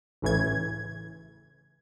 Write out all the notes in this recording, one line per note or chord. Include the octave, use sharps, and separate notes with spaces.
A1 A2 C#3 E3 G#6